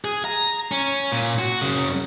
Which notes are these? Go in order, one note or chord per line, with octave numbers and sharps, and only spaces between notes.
G#4
A#5
C#4
A#2
F#4
F#2 C#3